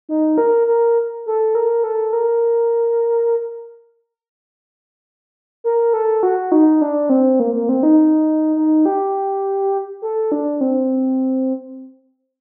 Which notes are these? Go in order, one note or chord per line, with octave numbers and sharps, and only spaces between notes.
D#4
A#4
A#4
A4
A#4
A4
A#4
A#4
A4
F#4
D#4
D4
C4
A#3
A#3
C4
D#4
D#4
G4
A4
D4
C4